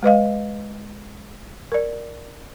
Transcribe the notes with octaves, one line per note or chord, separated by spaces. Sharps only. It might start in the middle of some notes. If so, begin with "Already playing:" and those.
G#3 B4 D#5 F5
A#4 D5